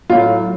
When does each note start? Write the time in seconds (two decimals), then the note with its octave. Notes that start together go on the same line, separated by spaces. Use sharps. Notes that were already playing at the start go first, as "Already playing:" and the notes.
0.10 A2 F#3 F4